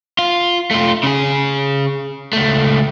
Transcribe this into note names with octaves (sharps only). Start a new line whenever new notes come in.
F4
A3 F4
C#3 G#4
C#2 A3